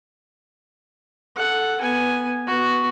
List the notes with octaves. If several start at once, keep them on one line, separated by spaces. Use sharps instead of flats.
A4 F#5
B3 G#5
B3 F#4